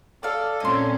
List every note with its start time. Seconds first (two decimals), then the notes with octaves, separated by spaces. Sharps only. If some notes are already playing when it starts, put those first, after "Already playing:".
0.23 A4 D5 F5
0.60 A#2 C4 C#4 D#5 C6